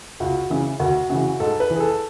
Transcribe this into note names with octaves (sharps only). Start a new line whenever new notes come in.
C#2 F#4
C#3 E3
D2 F#4
C#3 E3 F#4
G#2 A4
B4
E3
G#4
A4